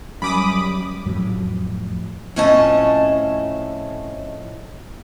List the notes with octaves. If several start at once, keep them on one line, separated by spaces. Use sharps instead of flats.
F#2 G3 B5 D6 D#6
F2 A2 F#3
F2 A2 C#4 D#5 A5